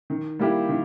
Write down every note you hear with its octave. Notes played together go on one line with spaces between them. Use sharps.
D#3
G3 A#3 E4 G4
D#3